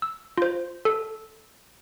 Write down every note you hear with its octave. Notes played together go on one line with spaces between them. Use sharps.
E6
F4 C5
A4